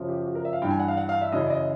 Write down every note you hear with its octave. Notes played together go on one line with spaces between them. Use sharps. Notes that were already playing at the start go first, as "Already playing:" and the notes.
Already playing: F#2 C#3 F3
G4
G4
F#4
A#4
E5
F5
G2 E3 G5
G#5
F#5
F5
F#5
F5
E5
F#2 C#3 E3 D#5
D5
D#5